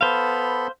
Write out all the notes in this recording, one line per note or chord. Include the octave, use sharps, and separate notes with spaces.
B3 A4 C5 F5 B5